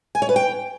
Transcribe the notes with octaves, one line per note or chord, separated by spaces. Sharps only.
G#5
C#5
B4
G5